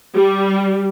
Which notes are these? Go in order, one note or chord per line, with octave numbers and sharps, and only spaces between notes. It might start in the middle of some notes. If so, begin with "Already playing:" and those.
G3